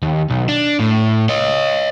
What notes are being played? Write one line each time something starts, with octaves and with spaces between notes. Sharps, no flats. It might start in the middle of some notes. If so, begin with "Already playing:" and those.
D#2
B1
D4
A2
C#5 D#5